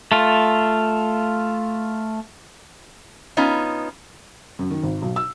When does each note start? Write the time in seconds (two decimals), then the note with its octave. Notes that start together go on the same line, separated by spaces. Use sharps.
0.12 A3 F4
3.37 B3 C#4 D#4 F4
4.59 F#2
4.71 D#3
4.83 G#1
5.02 B1
5.16 E6